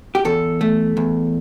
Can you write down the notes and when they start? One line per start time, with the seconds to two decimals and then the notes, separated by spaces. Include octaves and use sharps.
0.15 G4
0.25 E2 A4
0.61 A3
0.97 E2